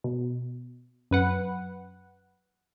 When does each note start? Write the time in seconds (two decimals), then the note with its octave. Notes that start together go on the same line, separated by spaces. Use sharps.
0.04 B2
1.11 F#2 B4 F#5